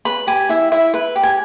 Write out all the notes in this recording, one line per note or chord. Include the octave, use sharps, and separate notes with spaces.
B4 B5
G4 G#5
E4 E5
E4 E5
B4
G4
G#5